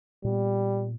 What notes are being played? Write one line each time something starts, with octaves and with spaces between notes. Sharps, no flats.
A#2 G3 B3